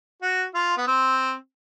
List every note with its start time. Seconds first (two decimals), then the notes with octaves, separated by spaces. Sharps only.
0.22 F#4
0.54 F4
0.77 B3
0.87 C4